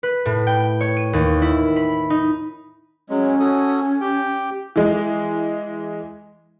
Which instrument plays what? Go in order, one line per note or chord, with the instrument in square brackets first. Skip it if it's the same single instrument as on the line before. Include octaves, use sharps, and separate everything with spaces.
[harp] B4
A2
G5
C#5
D#7
D#2
E4
B5
D#4
[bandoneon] F#3 G#3 [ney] C#4
[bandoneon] F#4 A4 D#6
G4 G5
[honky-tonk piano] E3 G#3